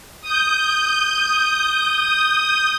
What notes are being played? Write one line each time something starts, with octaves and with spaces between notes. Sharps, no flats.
D#6 G6